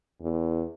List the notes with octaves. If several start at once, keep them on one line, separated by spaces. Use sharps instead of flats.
E2